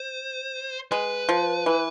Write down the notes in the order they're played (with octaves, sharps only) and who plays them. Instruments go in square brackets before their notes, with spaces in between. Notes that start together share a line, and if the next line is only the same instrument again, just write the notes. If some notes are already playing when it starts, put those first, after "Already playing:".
Already playing: [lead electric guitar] C5
[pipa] G#3 [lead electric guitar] B4
[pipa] F3
E3